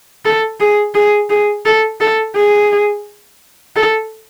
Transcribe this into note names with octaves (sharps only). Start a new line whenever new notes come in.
A4
G#4
G#4
G#4
A4
A4
G#4
A4